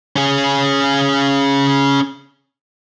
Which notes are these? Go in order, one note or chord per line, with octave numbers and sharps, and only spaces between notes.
C#4 G#4